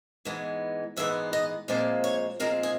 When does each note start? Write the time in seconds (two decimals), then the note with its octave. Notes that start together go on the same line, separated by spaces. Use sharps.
0.25 G#2 E3 G#3 B3
0.97 G#2 E3 G#3 B3 E5
1.33 D#5
1.68 A#2 F3 G#3 C4 D5
2.04 C#5
2.40 A#2 F3 G#3 C4 A#4
2.63 G#4